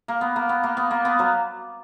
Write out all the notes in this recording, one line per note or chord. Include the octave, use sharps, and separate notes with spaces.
A#3
B3
A#3
B3
A#3
B3
A#3
B3
F#3 A#3